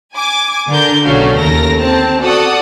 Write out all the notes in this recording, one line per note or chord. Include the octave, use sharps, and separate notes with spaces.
G#5 D6
D3 A#4 G6
B1 C#3 A3 C#4 F#4 F5
D#2 A4 A#4 A#6
C4 A5
F#4 A4 D5 F#5 D#6